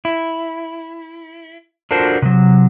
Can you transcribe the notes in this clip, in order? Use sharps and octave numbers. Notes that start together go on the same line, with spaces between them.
E4
D4 F4 F#4 A4 A#4 C5
C3 F#3